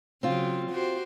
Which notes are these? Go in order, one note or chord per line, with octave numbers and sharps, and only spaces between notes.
C#3 F#3 C4 F4
F#4 G4 C5